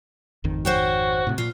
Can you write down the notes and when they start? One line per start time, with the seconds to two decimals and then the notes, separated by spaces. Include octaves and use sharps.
0.44 G#1 F2 D#3
0.65 F#4 C5 C#5 G5
1.27 A2 C3
1.38 A#2 F4